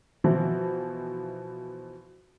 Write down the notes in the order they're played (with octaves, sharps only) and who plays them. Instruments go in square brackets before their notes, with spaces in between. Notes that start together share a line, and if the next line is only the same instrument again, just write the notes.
[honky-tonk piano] B2 E3 F3